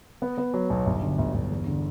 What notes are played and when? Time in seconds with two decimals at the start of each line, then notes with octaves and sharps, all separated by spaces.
0.22 B3
0.38 B3
0.54 F#3
0.70 B1
0.86 G1
1.02 D3
1.18 G1
1.34 G1
1.51 E2
1.67 D3